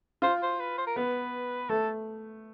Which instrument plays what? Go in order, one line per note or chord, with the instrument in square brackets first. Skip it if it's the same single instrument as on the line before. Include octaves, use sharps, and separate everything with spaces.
[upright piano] F4 [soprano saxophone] C5
[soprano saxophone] C5
B4
C5
A#4
[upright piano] B3 [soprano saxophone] B4
[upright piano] A3 [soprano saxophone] A4